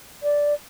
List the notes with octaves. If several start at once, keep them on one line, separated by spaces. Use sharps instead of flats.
D5